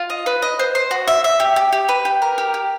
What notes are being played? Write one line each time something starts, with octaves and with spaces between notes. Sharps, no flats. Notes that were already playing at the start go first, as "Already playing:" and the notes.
Already playing: F4
D#5
B4
D#5
C5
C5
F#4
E5
E5
G4
G4
G4
B4
G4
A#4
G4
G4